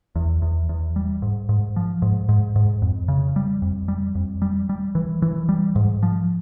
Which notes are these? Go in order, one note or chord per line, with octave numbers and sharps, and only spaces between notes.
E2
E2
E2
G3
G#2
G#2
F3
G#2
G#2
G#2
F2
C#3
G3
F2
G3
F2
G3
G3
E3
E3
G3
G#2
F3